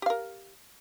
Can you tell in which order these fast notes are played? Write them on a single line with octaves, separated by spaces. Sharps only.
G4 F5 A#4